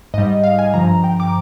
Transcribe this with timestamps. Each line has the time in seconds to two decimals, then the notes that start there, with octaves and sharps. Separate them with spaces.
0.14 G#2 G3 D#5
0.44 F5
0.59 G#5
0.74 G2 D3 F3 A#5
1.04 G5
1.20 D6